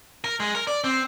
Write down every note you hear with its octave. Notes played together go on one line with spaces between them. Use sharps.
A#4
G#3
A#4
D5
C4